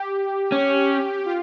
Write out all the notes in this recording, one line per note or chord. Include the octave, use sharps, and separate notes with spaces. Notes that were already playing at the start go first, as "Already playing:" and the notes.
Already playing: G4
C#4
F4